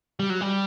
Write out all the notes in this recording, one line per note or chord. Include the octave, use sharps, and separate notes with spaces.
G3
F#3
G3